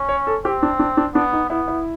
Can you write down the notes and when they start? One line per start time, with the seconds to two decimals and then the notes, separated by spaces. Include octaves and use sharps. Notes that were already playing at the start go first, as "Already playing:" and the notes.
Already playing: C#4
0.09 C#5
0.27 A4
0.44 C4 G4
0.63 D4
0.79 D4
0.97 D4
1.14 B3 D4
1.32 D#4
1.50 B3 E4
1.68 E4